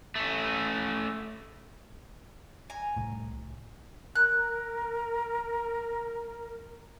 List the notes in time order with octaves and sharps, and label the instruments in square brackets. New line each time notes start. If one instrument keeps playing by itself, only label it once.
[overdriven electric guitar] A3 C#4
[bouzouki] G#5 A#5
[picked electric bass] C2 A2
[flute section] A#4 [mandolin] F#6